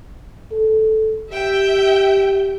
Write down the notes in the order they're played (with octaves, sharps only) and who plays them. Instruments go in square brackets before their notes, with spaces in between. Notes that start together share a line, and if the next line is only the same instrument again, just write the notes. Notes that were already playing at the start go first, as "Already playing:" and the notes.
[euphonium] A4
[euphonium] G4 [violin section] E5 G5